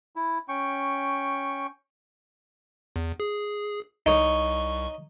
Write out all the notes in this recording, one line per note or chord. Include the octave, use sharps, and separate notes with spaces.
E4
C#4 G5 C#6
E2
G#4
C2 D#4 C#5 C#6